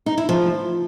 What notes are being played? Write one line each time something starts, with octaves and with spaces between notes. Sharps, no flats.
D#4
E4
F3